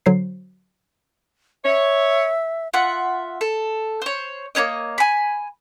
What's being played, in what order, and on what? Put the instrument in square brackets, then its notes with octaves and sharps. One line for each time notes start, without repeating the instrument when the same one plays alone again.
[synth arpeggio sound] D3 F#3 C5 C7
[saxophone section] C#5 [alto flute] E5
[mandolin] F4 E5 F#5
A4
C5 C#5
A#3 E4 C#5 D#5
G#5 B5